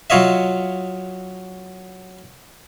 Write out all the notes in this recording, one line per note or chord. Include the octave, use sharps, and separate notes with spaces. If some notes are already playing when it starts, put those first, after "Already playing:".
F#3 F4 C#5 D#5 E5